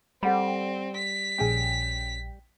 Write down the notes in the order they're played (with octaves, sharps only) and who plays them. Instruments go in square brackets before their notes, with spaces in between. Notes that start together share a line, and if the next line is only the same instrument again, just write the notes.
[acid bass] G3 [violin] C4 [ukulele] A4 F#5 B5
[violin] B6
[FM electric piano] A#1 G5 [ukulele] C#4 G#4 G#5